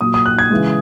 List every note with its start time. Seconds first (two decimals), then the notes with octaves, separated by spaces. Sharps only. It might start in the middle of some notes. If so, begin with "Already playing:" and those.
0.01 A#2 F#3 D#6
0.14 D#6
0.26 F#6
0.39 G#6
0.50 C#3 E3 G#3